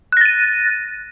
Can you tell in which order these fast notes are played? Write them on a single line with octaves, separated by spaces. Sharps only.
F#6 A#6 A6 D#7